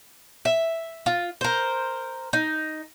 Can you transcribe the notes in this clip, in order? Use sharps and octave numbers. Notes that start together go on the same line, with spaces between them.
E5
F4
A#4 C5
D#4